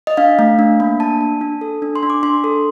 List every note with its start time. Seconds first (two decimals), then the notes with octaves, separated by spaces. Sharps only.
0.07 D#5
0.17 D4 F5
0.39 A3
0.59 D4
0.80 A#3
1.00 D4 A5
1.21 D4
1.41 D4
1.61 A4
1.82 D4
1.96 C6
2.03 D4
2.10 D6
2.23 D4 C6
2.44 A4